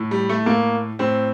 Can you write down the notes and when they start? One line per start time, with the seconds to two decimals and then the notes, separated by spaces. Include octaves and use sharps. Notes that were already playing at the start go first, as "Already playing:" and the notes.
Already playing: A2
0.11 G3
0.29 A3
0.46 A2 A#3
0.99 A2 C4